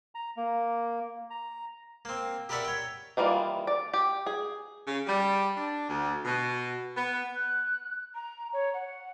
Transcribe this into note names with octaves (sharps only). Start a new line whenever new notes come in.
A#5
A#3
A#5
A#3 C4
G4 A#4 B4 D5 E5 F#5
C#5 G5
D#3 E3 G3 A#3 F4
D5
G4
G#4
C#3
G3
D4
D2
B2
B3
F#6
A#5
C#5
F#5